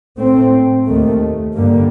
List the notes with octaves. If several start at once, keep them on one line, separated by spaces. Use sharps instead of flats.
A2 A3 C4
D#2 D#3 A3
G2 D3 G3 A#3